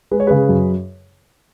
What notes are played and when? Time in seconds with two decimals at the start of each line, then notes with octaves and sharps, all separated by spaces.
0.11 G#3 B4
0.20 C#5
0.27 C#3 G#4 B4
0.49 F#2